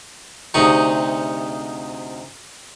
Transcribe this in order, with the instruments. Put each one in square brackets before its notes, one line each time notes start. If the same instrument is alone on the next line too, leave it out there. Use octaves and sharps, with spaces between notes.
[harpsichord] D2 C3 D#4 G4 G#4 C#6